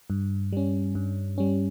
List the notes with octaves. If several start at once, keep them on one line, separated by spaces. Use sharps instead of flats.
G2
G3 C#4
G2
G3 C#4